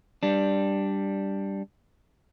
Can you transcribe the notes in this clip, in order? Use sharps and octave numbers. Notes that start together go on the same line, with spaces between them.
G3 D4